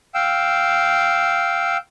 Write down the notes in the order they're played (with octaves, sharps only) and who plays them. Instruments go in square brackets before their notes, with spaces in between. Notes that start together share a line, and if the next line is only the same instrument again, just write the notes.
[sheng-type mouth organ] F5 G5 E6